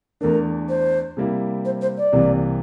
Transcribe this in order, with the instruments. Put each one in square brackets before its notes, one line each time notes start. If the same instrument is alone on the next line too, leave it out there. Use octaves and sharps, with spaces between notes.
[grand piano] E2 E3 A3 D4 [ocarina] A#4
[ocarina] C5
[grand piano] C3 G3 A#3 E4
[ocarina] C5
C5
D5
[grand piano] C2 C3 E3 A#3